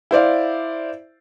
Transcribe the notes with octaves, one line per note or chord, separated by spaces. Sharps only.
E4 C5 D5 F5